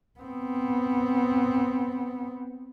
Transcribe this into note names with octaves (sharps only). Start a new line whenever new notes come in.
B3 C4